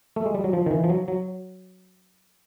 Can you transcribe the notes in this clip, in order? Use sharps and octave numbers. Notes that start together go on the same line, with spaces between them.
A3
G#3
G3
F#3
F3
D#3
E3
F3
F#3
F#3